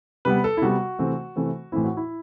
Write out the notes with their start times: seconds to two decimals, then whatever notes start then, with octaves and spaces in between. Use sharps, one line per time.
0.25 C3 G3 B3 B4
0.44 A4
0.57 E4
0.62 C3 G3 B3 F#4
0.99 C3 E3 A3 C4
1.36 C3 E3 A3 C4
1.72 A2 E3 A3 C4 E4
1.84 F#4
1.97 E4